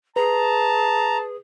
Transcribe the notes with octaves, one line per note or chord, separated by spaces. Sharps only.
G#4 B4 A5 A#5